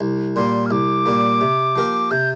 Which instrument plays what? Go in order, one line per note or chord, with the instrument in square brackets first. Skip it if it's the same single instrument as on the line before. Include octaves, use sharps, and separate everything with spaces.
[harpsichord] C2
[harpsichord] A#2 G3 A#3 [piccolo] C6
[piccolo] F6
[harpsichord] C2 [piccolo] D6
[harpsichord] A#2 G3 A#3
C3
F3 A#3 G4 A#4
[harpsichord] C3 [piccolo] G6